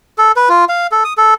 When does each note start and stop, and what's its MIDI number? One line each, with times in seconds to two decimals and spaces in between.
0.18 0.32 69
0.36 0.49 71
0.49 0.65 65
0.69 0.87 77
0.92 1.04 69
1.04 1.13 87
1.18 1.34 69